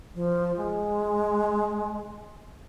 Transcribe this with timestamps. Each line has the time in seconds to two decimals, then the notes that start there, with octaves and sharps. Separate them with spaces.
0.14 F3
0.57 G#3